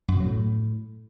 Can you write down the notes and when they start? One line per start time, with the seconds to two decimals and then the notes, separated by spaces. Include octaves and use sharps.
0.08 F#2
0.14 B2
0.20 F#3
0.26 A2